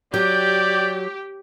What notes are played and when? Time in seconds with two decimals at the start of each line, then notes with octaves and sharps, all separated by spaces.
0.14 F#3 G4 D5 G6